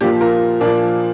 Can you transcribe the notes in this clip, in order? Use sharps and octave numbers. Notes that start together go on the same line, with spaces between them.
A#2 F3 D4 G4
F4 A#4
A#2 F3 A#3 D4